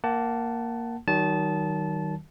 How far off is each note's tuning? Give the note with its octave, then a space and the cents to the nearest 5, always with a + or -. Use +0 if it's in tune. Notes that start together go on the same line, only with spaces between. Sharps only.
A#3 +0 F#5 +30 A5 +0
D#3 +0 F#3 +40 A5 -20